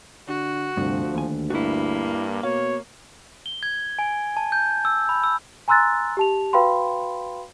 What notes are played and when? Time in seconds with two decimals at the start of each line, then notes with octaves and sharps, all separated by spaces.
0.28 D3 F#4
0.77 D2 G2 C3 F3
1.14 D#2 G#5
1.50 G2 A#3 E4 F#4
2.43 B2 C#5 F5
3.46 G7
3.63 G#6
3.99 G#5
4.37 A5
4.52 G6
4.85 E6
5.09 B5
5.24 E6
5.68 G#5 A#5 C6 E6 F#6 A6
6.17 G4 A5 F7
6.53 F#4 B4 F5 G5 B5 C6